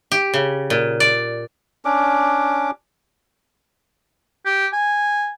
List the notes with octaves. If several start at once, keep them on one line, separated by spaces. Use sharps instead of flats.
G4
C#3
A#2
D5
C#4 D4 D6
G4
G#5